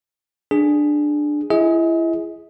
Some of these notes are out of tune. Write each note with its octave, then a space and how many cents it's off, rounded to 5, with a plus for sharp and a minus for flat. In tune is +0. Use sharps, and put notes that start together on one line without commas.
D4 +10 G#4 +0
E4 +25 G#4 +0 D#5 +40